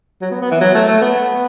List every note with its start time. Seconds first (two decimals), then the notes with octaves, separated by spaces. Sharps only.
0.21 F#3
0.31 B3
0.41 B3
0.51 E3
0.61 F#3
0.74 A3
0.88 A3
1.01 B3